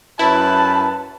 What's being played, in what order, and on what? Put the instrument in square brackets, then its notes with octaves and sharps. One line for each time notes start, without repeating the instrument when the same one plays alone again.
[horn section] F#2 B4 [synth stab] E4 [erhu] A5